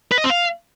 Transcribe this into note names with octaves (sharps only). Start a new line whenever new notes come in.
B4
D#5
C4
F5